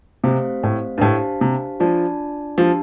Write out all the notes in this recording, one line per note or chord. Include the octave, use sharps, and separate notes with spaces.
C3 A3 C4 G4 C5 F5
A2
G2
A2 D4 G4 C5 F5 A5
C3
F3 D4 F4 D5 A5
F3 D4 G4 F5 A5